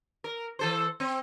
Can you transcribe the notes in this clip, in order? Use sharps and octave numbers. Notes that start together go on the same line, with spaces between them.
A#4
E3 A4 C5
C4